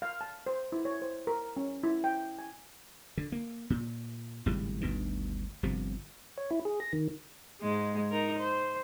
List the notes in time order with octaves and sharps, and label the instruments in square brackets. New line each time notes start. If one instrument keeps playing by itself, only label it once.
[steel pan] F5
A5
C5
E4
C#5
C5
A#4
C#4
E4
G5
G#5
[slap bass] D3
A#3
A#2
G#1 A2 C#3 G3
G1 D2 B2 D#3
G1 C3 F3
[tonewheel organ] C#5
E4
G#4
A#6
D#3
[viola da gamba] G#2 G#3
D#4 A#4
C5